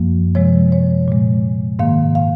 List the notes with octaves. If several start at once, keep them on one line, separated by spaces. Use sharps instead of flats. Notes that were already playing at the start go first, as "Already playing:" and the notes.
Already playing: F#2 F3 A#3
C3 F3 G#3 C#5
C#5
A#2 G#3
G#2 D#3 A#3 F5
F5